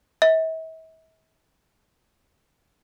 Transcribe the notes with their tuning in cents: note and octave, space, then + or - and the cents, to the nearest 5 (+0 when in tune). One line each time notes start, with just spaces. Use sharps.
E5 -40